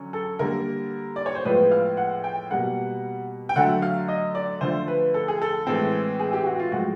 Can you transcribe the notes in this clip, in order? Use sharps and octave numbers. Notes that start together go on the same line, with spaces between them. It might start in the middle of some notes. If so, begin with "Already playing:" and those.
Already playing: D3 F#3 C#4
A4
D3 G3 A#3 A#4
D5
C#5
C5
A2 F3 G#3 B3 B4
F5
F#5
G5
B2 G3 A#3 F#5
G5
D3 F#3 A3 F#5
F5
D#5
D5
D3 F3 A3 C5
B4
A4
G#4
A4
A2 E3 G#3 C4
G#4
G4
F#4
F4
A2 F3 G#3 F#4